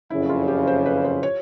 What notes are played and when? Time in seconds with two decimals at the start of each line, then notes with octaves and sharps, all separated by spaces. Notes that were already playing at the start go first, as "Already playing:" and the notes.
0.10 F#1 F2 C#3 E4
0.30 F4
0.48 G4
0.67 C5
0.86 B4
1.04 C5
1.23 C#5